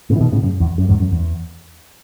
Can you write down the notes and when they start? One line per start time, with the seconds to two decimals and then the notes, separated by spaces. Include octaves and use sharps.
0.10 A2 C#3
0.16 E3
0.21 B2 D#3
0.33 A2 C#3
0.43 F#2
0.60 E2
0.78 F#2
0.89 E2 G#2
1.00 F#2
1.12 E2